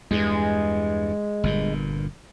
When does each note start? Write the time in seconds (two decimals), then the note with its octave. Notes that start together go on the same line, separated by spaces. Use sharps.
0.11 E2 G2 G#3
1.43 G1 G2 A#2